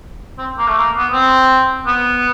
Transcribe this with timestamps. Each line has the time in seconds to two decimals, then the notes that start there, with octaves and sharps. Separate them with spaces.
0.38 C4
0.59 A#3
0.68 A3
0.78 A#3
0.97 B3
1.13 C4
1.87 B3